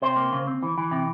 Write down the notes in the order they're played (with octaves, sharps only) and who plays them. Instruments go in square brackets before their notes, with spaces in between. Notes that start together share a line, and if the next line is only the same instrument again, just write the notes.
[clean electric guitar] C3 C5
A#3
C#3
C4
E3
E3
C3